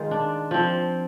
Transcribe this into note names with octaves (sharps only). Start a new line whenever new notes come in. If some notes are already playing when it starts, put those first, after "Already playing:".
Already playing: D#3 G#3 F4
D4
F3 C4